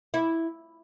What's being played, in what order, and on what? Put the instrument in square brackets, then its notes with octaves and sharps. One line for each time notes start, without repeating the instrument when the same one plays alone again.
[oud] E4